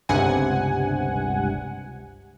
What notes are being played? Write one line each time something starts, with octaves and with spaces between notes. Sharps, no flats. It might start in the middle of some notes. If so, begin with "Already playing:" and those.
G1 C#2 G2 C3 F#5 G#5